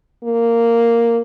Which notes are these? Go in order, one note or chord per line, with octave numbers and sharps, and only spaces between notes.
A#3